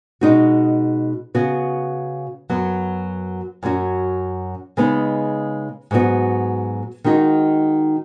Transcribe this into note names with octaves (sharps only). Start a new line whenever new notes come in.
B2 G#3 D#4 F#4
C#3 B3 F#4
F#2 F#3 B3
F#2 F#3 C#4 F#4
C#3 G#3 B3 D#4
G#2 F#3 B3 F#4
D#3 G#3 D#4 F#4